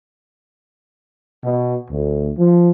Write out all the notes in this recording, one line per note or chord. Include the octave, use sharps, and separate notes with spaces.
B2
D2
F3